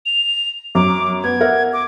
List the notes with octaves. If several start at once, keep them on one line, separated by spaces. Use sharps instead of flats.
F7
F#2 D6
B3 G#6
A#4 E5 F#5
D6